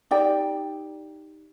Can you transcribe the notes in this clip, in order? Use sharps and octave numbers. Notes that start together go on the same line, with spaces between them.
D#4 G4 D5 G5